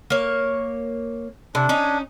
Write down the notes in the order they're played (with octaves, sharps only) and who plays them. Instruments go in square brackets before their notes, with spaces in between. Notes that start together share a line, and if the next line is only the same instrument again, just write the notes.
[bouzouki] A#3 C#5
[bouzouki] C3 E4 [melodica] D4
[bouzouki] C#4 D#4